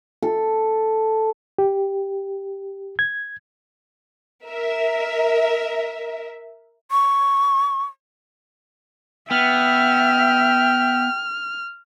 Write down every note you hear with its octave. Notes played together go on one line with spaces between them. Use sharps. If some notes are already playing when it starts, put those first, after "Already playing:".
A4
G4
G#6
A#4 E5
C#6
B3 E5 G5 F6